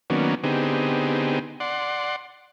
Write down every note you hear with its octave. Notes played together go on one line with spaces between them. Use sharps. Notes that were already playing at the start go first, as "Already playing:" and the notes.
D#3 F#3 A#3 B3 C#4 D4
D3 B3 C4 D#4 G4 G#4
D5 F#5 C6